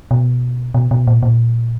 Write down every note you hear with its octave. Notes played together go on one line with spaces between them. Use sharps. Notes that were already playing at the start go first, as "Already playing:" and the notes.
B2
B2
B2
A#2
A#2